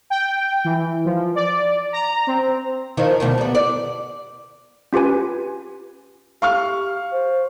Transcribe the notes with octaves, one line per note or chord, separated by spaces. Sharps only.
G5
E3
F3
D5
A#5
C4
D#3 F3 D#4
D2 B2 D#3
G3 B3
D5
C#4 F4 G4 B4 G#5
G4 F5 C#6 F6
C5